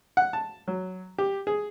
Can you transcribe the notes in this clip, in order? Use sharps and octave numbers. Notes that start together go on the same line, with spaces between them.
F#5
A5
F#3
G4
G#4